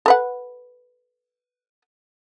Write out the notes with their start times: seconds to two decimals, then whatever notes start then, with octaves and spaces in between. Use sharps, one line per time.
0.06 A4 B4 F#5